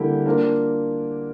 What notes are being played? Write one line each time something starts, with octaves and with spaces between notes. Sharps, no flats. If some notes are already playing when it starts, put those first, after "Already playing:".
Already playing: D3 G3 A#3 E4 G4
A#3 D4 F4 A#4